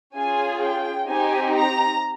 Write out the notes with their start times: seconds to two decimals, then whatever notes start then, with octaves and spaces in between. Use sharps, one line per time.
0.15 C#4 F4 G#4 G#5
0.61 G5
1.08 C4 D#4 G4 G#5
1.54 A#5